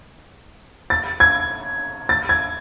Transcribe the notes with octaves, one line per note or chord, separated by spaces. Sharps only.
A6
G#6
A6
G#6